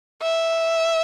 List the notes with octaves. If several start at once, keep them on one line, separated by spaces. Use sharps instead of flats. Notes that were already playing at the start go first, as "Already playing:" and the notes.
E5